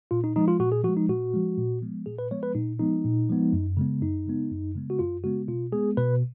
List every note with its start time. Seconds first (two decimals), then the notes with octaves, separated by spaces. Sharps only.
0.11 A#2 F4
0.24 D#4
0.36 F3 G#3 D#4
0.48 F4
0.60 A#2 F#4
0.72 G#4
0.84 F3 F#4
0.89 G#3
0.97 D#4
1.09 A#2 F#4
1.34 F3 G#3
1.58 A#2
1.82 F3 G#3 B3
2.06 A#2 G#4
2.19 B4
2.31 F3 G#3 B3 C#5
2.43 B4
2.55 A#2 D#4
2.79 F3 G#3 B3 D#4
3.04 A#2
3.29 F3 G#3 B3
3.53 F#2
3.77 C#3 G#3 B3
4.02 F#2 D#4
4.26 C#3 G#3 B3
4.51 F#2
4.75 C#3 G#3 B3
4.90 F#4
4.99 F#2 F4
5.24 C#3 G#3 B3 F#4
5.48 B2 F4
5.72 G#3 B3 G#4
5.97 B2 B4